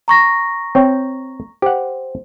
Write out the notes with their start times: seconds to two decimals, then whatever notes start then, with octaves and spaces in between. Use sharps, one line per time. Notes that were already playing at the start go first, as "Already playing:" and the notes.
0.08 A#5 C#6 A#6
0.75 C4 C#5 G5
1.62 G4 C5 F#5